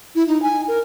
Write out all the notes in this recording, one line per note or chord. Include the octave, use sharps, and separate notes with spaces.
E4
D#4
G#5
A#4